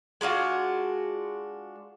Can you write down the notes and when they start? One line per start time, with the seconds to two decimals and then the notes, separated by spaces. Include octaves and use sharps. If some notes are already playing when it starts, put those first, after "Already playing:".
0.21 G#3 D4 F4 F#4